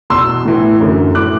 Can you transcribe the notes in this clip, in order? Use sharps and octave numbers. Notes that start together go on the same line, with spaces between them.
E2 B2 C6 E6
A2 E3
F#2 D3
A2 E3 D6 F#6